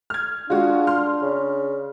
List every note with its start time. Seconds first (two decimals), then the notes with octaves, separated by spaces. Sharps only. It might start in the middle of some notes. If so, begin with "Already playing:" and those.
0.10 F6 G#6
0.50 G#3 D4 F4 F#4
0.87 C6 F6
1.22 C#3